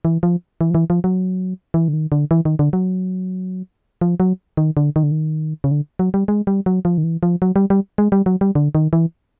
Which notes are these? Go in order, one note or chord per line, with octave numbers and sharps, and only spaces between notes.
E3
F3
E3
F3
E3
F3
F#3
E3
D3
D#3
D3
E3
D#3
D3
F#3
F3
F#3
D#3
D3
D#3
D3
D#3
C#3
D3
F#3
G3
G#3
G3
F#3
F3
D#3
E3
F3
F#3
G3
G3
G#3
G3
F#3
G3
D3
D#3
E3